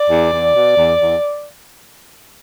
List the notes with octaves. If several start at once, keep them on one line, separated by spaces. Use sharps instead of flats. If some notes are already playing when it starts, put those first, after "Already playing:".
Already playing: D5
E2
E2
B2
E2
E2